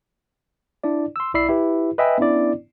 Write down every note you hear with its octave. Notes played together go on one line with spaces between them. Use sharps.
D4 E4 D5
C6 E6
B1 E4 D5 B5 E6 C7
E4 G4 B4
B4 D#5 E5 G5 G#5 B5
B3 C#4 D4 E4 D5